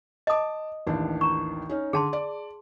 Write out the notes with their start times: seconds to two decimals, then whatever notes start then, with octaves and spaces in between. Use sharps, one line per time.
0.27 D#5 A5 D6 D#6
0.87 A1 D#2 D4
1.21 A#5 C#6
1.69 C#4 D#4
1.93 D3 G#4 A5 C6
2.13 D5